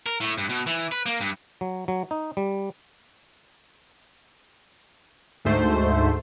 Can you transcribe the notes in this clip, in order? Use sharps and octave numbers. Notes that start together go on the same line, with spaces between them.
A#4
A2
G2
B2
E3
B4
A#3
G2
F#3
F#3
D#4
G3
D2 G#2 A3 C5